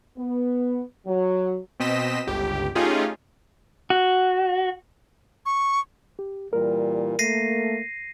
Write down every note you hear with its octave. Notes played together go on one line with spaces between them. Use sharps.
B3
F#3
B2 C4 D#5 B6 E7
G1 C#2 G4
A3 C#4 D#4 F4 G4 G#4
F#4
C#6
G4
A#2 E3 G3 A#4
A3 A#3 A#6 C7 D#7